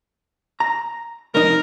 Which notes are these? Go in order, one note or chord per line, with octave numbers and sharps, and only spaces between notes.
A#5
C2 F2 D#4 A#4